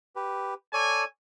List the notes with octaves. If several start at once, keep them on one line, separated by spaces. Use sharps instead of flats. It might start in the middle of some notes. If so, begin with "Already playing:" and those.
G4 B4
A4 C#5 D5 G#5